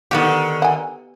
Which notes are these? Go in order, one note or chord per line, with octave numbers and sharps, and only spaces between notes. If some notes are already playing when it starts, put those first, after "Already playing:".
D3 D#3 B3 F#4 G4
F#5 G#5